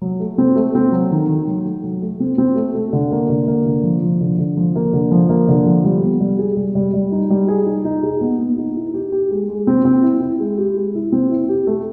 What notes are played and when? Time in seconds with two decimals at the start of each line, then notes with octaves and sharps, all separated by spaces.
0.01 F#3
0.20 A3
0.38 C4
0.56 A3
0.75 C4
0.92 F#3
1.11 D#3
1.29 D#3
1.47 F#3
1.65 A3
1.84 F#3
2.02 A3
2.20 C4
2.38 C4
2.56 A3
2.75 A3
2.93 D3
3.12 A#3
3.30 D3
3.47 A#3
3.66 D3
3.83 F3
4.02 F3
4.21 D3
4.38 D3
4.57 F3
4.76 A#3
4.93 D3
5.11 F3
5.29 A#3
5.48 D3
5.66 F3
5.84 G3
6.03 B3
6.20 G3
6.39 G#4
6.57 G3
6.75 G3
6.94 G3
7.12 D#4
7.30 G3
7.48 G#4
7.66 D#4
7.85 D#4
8.03 G#4
8.21 B3
8.39 B3
8.58 D#4
8.76 E4
8.94 G4
9.12 G4
9.31 G#3
9.49 G#3
9.67 C4
9.85 C4
10.03 E4
10.22 E4
10.40 G#3
10.58 G4
10.76 G#3
10.95 E4
11.12 C4
11.31 E4
11.49 G4
11.67 A3